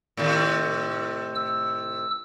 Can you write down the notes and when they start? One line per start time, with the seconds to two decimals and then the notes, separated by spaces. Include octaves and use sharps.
0.17 A2 C3 D#3
1.35 E6